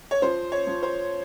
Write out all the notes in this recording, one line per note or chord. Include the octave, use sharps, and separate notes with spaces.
C#5
F3 C5
C#5
F3
C5